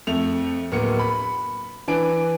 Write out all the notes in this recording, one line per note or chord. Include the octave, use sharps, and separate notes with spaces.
F2 A3 F7
D1 A#3 B3 C#7
B5
E3 D4 B4 G#5 D7